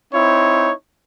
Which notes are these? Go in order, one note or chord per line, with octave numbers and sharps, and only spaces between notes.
C4 D#4 E4 C#5